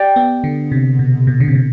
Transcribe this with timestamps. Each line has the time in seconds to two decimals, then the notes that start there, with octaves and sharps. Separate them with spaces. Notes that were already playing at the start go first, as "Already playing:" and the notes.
Already playing: G4 D5 G5
0.16 B3
0.44 D3
0.72 C3
0.99 B2
1.27 B2
1.40 D3
1.48 C3
1.55 B2